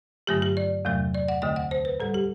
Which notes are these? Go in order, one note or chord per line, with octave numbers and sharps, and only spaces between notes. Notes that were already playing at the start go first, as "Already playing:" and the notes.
G2 D3 F#3 A3 G4
G4
D5
E2 C3 F#3 A3
D5
F#5
D2 D3 A3 G5
F#5
C5
B4
A2 G3 A4
G4